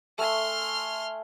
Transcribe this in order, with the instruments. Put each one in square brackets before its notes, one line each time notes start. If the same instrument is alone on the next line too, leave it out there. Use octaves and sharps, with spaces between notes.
[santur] A3 G#5 [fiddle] C6 F6